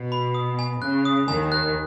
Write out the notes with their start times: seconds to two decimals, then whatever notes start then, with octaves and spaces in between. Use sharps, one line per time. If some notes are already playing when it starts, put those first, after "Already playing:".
Already playing: B2
0.12 B5
0.34 D#6
0.59 G#5
0.81 C#3 F#6
1.05 D#6
1.28 D#2 D#3 G#5
1.52 F#6